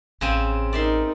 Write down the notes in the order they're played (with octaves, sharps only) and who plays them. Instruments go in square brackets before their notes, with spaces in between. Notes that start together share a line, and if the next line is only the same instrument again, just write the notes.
[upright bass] A1 [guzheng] C#3 C4 G#5
[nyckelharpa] D#4 A#4 [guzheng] D5 E5 C6